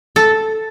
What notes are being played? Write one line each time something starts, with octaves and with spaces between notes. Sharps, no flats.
A4